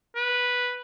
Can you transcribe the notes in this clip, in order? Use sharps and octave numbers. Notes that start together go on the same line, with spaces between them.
B4